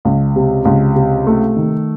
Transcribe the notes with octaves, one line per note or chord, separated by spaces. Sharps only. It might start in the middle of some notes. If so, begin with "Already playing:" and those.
C#2
C3
C#2
C3
A3
D#3